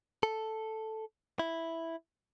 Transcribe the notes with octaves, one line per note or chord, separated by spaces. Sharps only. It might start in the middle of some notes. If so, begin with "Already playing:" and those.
A4
E4